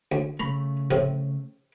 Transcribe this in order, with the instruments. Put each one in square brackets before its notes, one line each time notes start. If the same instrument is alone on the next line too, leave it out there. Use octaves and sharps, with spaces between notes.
[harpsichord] D2
[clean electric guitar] C#3 A3 [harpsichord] A#5 B5
[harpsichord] A2 C3 F3